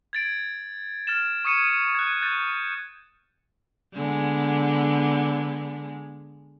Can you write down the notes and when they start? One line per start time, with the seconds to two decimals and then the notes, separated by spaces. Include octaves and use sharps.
0.13 G#6 A6 D7
1.07 F6 A6 E7
1.45 C#6 D#6 G#6 C#7 D#7 E7
1.95 F#6 G#6
2.21 F#6 G6 A6
3.95 D3 G#3 B3